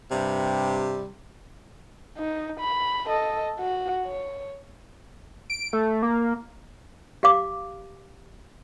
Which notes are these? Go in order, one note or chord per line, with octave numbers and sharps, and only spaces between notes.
G2 C3 G3
D#4
B5
A4 D#5
F#4
C#5
D7
A3
A#3
G4 F5 D6